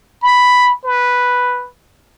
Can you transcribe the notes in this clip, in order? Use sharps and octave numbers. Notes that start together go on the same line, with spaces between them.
B5
B4